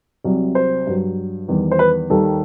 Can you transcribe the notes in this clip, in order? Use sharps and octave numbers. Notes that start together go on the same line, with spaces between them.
C2 C3 F#3
C5
G2 F#3
E2 D#3 G3
C5
B4
D#2 D#3 G3 A4